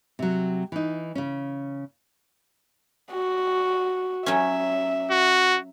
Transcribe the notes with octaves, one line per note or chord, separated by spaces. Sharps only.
C3 F#3
E3 D#4
C#3 C#4
F#4
F#3 C#4 E5
F#4